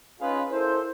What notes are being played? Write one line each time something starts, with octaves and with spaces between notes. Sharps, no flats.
C#4 D#4 F4 G#4 B4 F5
E4 A4 A#4 C5